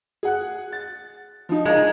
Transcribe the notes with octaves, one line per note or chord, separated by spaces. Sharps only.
G#4 F#5 F#6
A6
F3 D#4
G#3 A#4 F5 A#5